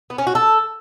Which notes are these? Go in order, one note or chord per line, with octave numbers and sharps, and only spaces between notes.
B3
C#4
F#4
A4